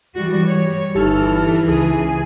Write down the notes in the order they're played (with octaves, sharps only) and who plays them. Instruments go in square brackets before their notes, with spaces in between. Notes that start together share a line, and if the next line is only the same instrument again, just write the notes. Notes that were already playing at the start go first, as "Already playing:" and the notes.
[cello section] E3 G3 F#4
G3 C#5
[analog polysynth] G1 A4 F6 [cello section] E3 [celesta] D#4 G4
[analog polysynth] C#2 G#4 D#7